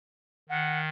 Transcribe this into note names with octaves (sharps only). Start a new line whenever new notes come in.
D#3 F#5